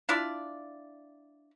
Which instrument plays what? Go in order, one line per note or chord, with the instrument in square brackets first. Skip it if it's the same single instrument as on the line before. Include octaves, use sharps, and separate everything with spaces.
[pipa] D4 E4 F4 D5